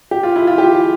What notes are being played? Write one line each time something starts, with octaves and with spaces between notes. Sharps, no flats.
G4
F4
E4
F4
G4